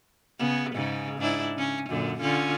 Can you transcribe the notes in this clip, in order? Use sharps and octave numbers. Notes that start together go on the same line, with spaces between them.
C#3 B3
G#2 C#3
G#2 D4 E4
C#3 C#4
F#2 A#2 D3
D3 C#4 F4